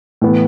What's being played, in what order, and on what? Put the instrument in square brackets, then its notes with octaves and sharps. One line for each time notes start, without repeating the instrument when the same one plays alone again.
[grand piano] A2 E3 B3